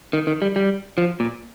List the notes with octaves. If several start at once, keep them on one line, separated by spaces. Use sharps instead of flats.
D#3
D#3
G3
G3
F3
A#2